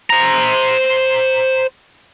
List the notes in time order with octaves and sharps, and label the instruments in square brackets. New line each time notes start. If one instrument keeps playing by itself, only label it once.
[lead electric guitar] C5 A#5